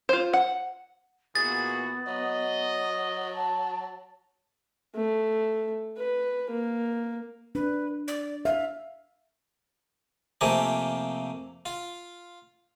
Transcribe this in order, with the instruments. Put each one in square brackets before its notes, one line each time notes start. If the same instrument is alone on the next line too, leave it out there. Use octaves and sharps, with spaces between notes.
[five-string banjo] F4 C5
F#5
[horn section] A#2 E3 F#4 [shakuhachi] B3 [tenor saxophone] G#4 [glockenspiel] A6
[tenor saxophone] F#3 [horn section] D#5
[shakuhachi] A5
[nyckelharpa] A3
B4
A#3
[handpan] D4 [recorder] B4
[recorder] D5
[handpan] E5 [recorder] F5
[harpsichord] F2 C3 A3 A#3 G4 G#5
F4